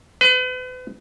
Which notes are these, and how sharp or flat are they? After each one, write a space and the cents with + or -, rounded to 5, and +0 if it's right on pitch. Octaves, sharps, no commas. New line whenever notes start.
B4 +40